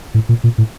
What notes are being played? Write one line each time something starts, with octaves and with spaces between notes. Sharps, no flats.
A2
A#2
A#2
A2